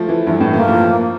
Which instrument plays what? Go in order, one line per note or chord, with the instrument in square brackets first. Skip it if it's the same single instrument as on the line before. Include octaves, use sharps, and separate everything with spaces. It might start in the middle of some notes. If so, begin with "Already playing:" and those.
Already playing: [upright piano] F3 A3
E3
[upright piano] G2 [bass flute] E3
[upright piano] A2
[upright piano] E3 [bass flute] A#3
[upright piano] F3